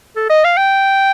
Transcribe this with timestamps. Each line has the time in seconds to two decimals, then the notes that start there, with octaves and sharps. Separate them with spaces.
0.16 A4
0.30 D#5
0.45 F5
0.57 G5